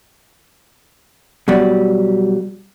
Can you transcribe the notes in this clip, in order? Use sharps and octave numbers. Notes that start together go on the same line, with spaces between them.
B2 F#3 G3